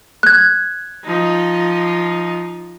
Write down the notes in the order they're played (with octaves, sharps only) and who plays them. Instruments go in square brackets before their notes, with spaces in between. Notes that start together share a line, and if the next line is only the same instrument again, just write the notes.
[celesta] F#6 G#6
[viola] F3 D#4